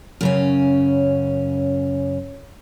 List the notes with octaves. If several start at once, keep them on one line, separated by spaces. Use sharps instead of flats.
F#2 C#3 C#4